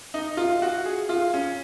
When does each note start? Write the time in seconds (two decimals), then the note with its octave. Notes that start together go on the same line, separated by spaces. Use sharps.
0.14 D#4
0.37 F4
0.62 F#4
0.86 G#4
1.09 F4
1.34 C#4